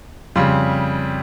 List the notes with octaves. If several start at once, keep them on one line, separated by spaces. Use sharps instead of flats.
F2 C#3 G3 C6